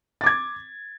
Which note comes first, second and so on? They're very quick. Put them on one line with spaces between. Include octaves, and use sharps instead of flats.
A6 D6 G#6